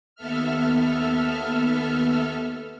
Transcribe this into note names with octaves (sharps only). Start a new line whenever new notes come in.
D#2 B3 A4 E5 F6